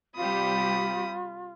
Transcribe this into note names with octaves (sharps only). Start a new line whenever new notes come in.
C3 G3 F4 G4 B5 D#6